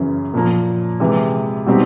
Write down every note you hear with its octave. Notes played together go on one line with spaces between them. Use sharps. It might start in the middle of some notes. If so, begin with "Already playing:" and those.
Already playing: F#2 C#3 E3
A#2 F3 A#3
C3 E3 G#3
B2 G3 C4 D#4 G4